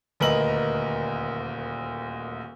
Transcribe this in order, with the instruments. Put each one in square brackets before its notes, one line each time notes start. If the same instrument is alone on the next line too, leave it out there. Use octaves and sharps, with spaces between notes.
[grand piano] D#1 D2 A#4 B4 D#5 F#7